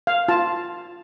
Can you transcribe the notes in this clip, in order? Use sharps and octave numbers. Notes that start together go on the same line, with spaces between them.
F5
F4 A5